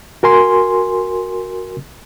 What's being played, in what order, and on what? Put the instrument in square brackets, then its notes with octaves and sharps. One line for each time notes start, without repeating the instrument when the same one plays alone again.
[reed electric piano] F#4 A#4 G#5 C6